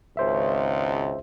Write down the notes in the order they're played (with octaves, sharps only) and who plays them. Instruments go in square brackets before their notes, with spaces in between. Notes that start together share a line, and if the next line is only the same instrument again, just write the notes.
[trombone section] G#1 C#2 [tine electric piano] C5 E5